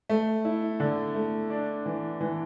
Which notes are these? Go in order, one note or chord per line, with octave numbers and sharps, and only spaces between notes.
A3
E4
D3
A3
D4
E3
E3